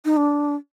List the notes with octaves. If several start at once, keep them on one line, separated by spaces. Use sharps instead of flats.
D#4
D4